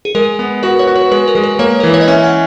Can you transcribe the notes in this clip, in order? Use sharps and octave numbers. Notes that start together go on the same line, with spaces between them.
G#4
G#3 A#4
B3
F#4 B4
C#5
F#4
B4
G#3 B4
A#4
G#3
B4
A#3 C#5
A#4
E3 B4
C#5
D#5
C#4 E5
F#5